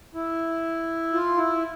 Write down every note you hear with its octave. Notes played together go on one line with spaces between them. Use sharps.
E4
F4
E4